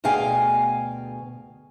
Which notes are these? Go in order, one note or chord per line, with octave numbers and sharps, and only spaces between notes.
D2 B2 G#4 F5 G5 G#5